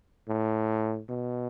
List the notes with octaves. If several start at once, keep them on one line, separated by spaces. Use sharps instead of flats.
A2
B2